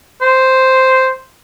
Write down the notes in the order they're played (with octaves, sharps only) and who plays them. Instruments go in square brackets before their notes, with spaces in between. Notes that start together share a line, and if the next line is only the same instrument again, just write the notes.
[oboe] C5